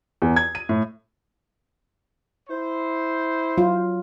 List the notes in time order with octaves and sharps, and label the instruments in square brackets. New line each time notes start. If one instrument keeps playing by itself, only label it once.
[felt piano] E2
G#6
D#7
A2
[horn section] E4 C5
[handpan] F#3 F4